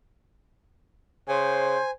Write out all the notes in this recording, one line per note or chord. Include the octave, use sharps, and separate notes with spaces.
C#3 C5 G#5